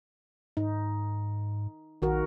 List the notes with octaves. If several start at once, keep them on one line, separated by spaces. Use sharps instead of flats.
G#2 D#4
A#1 D#3 F#4 A#4